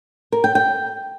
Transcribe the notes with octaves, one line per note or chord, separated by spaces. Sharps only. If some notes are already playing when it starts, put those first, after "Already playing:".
A#4
G5
G5